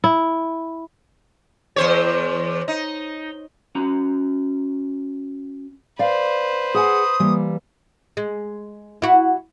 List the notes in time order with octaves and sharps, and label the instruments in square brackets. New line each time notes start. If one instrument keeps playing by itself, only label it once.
[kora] E4
[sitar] E2 C5 C#5
D#4
[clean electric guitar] C#4 F#4 A#5
[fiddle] B4 C5 [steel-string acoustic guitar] D5 F5
[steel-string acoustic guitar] G#4 F#5 G#5 [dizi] D#6
[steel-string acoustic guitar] E3 G3 A#3
[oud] G#3
E4 F#4